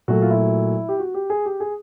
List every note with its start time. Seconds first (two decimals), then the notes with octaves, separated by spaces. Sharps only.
0.08 A#2 F#3 A3 F#4
0.22 F4
0.30 E4
0.89 G4
0.99 F#4
1.14 G4
1.30 G#4
1.46 G4
1.60 G#4